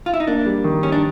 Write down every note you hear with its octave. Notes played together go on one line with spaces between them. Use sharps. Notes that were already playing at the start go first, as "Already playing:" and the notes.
F4
E4
D#4
A#3 D4
G3
D#3
G3 C#4
D4